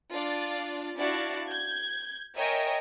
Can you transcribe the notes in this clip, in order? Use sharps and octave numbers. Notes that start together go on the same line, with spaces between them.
D4 F4 D5
D4 E4 F#4 D5 F5
G6 G#6
A#4 C#5 D#5 E5 G5 G#5